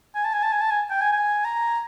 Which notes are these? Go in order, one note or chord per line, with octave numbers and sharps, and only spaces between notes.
G#5
A5
G#5
A5
G#5
A5
G#5
G5
G#5
G#5
A#5